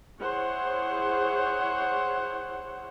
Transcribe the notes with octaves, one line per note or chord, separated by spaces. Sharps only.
E4 G#4 C5 C#5 F#5